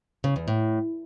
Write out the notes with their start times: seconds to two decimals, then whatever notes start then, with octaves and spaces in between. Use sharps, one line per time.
0.24 C#3
0.36 E2
0.48 A2